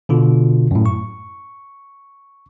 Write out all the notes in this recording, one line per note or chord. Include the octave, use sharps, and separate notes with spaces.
B2 D3 F4
F#2 A2
C#6